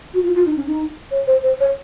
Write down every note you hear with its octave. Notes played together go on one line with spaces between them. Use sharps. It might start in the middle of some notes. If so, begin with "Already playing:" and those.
F#4
F4
F4
D#4
C#4
D#4
C#5
C5
C5
C#5